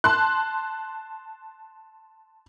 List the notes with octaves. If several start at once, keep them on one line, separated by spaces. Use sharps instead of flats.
A5 C6 F#6